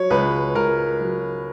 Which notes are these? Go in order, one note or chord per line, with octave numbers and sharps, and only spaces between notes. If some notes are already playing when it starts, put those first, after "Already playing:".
Already playing: F#3 C#5
C#2 B4
C#2 A#4
F#3